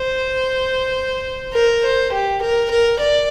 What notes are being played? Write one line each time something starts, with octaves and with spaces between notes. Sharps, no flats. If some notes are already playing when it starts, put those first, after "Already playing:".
Already playing: C5
A#4
C5
G4
A#4
A#4
D5